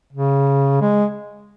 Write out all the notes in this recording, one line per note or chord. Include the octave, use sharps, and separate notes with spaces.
C#3
G#3